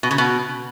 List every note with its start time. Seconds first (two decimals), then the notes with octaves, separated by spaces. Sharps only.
0.03 B2
0.11 C#3
0.18 B2